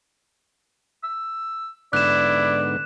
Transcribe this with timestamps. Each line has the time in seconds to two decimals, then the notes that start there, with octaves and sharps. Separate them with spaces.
1.04 E6
1.93 G#2 D3 B3 E4 D5 F#6 E7